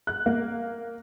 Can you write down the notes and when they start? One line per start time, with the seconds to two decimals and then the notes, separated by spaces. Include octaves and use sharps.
0.07 F#6
0.26 A#3